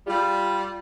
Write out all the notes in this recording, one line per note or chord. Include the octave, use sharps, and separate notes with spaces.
G3 F4